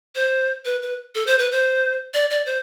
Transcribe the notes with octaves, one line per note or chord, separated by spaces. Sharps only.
C5
B4
B4
A4
C5
B4
C5
D5
D5
C5